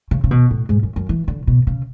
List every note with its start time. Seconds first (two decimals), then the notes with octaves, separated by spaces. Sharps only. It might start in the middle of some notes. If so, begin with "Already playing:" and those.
0.11 C#3
0.24 C#3
0.31 B2
0.51 A2
0.69 G#2
0.83 F#2
0.96 F#2
1.09 E3
1.28 D3
1.47 B2
1.67 C#3